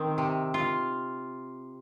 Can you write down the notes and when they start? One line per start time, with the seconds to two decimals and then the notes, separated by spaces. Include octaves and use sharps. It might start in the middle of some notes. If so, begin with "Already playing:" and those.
Already playing: D#3 C4
0.18 C3
0.54 F4